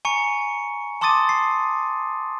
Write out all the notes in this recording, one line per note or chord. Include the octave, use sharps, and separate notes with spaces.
G#5 A#5 C#6 C#7
A5 C6 D6 D#6 A6 D#7
C7